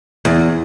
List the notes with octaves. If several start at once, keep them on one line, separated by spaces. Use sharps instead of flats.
E2